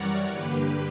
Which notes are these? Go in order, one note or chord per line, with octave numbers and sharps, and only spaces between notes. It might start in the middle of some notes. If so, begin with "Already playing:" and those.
Already playing: F#2 E3 G3 A#4 C#5 D5 F#5
G2 D3 A#3 G4 B4